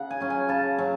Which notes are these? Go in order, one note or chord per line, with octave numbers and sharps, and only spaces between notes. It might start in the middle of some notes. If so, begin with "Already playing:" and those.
Already playing: C#3 F#5
G#5
F#3 C#4
G#5
C#3 A5
F#3 C#4